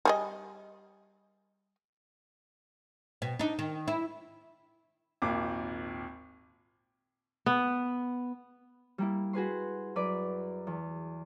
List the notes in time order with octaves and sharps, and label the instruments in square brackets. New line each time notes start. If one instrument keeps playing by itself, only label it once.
[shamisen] G3 G#4 D#5
[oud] B2
D4 D#4
D#3
E4
[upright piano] G#1 D#2 A#2 D6
[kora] B3
[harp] G3 A#3 E4
F#4 G#4 B4 C6
F#2 B4 D5
E2